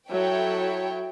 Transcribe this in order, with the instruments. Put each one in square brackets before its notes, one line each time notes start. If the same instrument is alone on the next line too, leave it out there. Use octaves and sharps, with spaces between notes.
[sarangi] F#3 [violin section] E4 A4 C#5 E5 G5